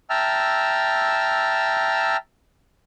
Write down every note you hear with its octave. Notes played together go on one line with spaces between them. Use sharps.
E5 G5 A5 A#5 E6 F6